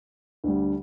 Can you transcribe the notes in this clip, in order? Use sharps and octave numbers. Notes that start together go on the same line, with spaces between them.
D2 D3 G3